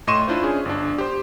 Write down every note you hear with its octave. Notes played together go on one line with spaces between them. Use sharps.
A2 D#5 C6 C#6 D#7 E7
D4 E4 F4 C5
C#4 G#4
G1 D4
G4 C5